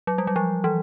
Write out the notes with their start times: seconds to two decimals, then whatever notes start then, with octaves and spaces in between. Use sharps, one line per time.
0.07 F#3
0.18 G3
0.27 F#3
0.36 F3
0.64 E3